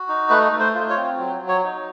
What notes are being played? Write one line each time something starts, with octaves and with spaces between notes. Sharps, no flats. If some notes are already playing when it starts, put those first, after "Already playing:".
Already playing: F#4
D#4
A3 B4
A3
C5
F4
C#5
C4
F#3
F#3
C#5
D#4